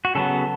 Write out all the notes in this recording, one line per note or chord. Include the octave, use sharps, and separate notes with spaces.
F#4
C#3 F#3 B3 A4